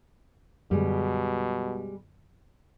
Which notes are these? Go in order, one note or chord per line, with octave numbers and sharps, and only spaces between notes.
F#2 B2 D3 G3 G#3